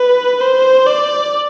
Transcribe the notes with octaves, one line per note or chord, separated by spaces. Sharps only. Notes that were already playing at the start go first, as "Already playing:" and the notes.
Already playing: B4
C5
D5